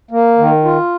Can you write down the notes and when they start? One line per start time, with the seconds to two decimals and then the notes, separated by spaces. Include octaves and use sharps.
0.11 A#3
0.38 D#3
0.64 F4